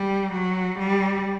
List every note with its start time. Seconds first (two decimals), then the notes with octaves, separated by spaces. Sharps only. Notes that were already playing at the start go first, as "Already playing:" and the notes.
Already playing: G3
0.32 F#3
0.79 G3